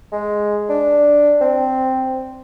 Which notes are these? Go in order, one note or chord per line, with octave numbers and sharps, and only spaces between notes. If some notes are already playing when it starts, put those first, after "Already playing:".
G#3
D4
C4